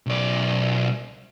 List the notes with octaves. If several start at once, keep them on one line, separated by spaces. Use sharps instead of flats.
B1 D5